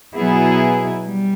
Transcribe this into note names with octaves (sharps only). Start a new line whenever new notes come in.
B2 F#3 B3 E4 G#4
G3